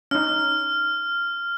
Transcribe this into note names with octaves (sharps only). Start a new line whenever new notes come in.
C#4 D#4 F6